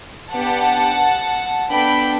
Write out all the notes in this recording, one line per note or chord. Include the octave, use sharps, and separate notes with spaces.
B3 D4 G4 F#5 A5
B3 D4 A4 G5 B5